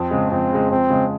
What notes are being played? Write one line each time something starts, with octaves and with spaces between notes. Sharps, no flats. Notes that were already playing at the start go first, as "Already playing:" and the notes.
Already playing: F2 C4
C#3 G#3
F2 C4
C#3 G#3
F2 C4
C#3 G#3